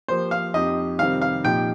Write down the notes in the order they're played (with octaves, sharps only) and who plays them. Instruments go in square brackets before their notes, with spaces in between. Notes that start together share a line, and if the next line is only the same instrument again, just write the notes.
[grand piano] F3 A#3 G4 [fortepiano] C5
[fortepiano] F5
[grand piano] F2 F3 D#4 G4 [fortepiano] D#5
[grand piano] F2 C3 D#3 G3 C4 [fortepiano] F5
[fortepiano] F5
[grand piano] A#2 F3 D#4 G4 [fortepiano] G5